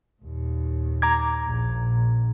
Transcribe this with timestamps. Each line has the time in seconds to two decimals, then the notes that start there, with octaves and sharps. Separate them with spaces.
0.22 D#2 A#2
1.02 A#5 D6 G#6
1.46 A#1 A#2